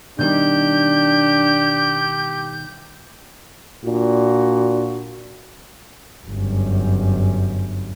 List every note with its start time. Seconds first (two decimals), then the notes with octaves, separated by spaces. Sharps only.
0.19 B2 D#3 G3 D4 G4 G6
3.85 A#2 D4 F4 F#4
6.27 G1 F#2